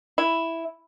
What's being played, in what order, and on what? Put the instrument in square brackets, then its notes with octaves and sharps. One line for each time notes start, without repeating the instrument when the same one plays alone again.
[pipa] E4